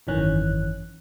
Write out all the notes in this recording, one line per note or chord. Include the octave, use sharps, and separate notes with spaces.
G#1 F#2 D#3 E3 C#4 F#6